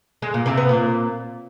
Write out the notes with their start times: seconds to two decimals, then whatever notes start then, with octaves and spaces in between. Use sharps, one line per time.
0.22 G#3
0.34 A#2
0.46 C3
0.57 B3
0.69 A#2